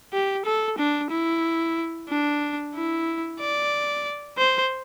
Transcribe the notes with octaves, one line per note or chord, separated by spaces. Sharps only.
G4
A4
D4
E4
D4
E4
D5
C5